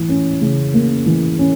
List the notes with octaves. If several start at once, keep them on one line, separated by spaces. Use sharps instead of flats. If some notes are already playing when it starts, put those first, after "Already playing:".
Already playing: E3
C#4
C#3
A#3
E3
C#4